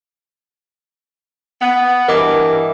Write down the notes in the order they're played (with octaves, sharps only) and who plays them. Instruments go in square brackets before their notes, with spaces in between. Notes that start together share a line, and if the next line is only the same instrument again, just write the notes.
[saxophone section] B3
[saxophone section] G2 E3 [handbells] A#4 D#5 D6